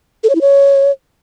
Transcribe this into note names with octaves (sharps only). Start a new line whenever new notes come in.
A4
C#5
E4
C#5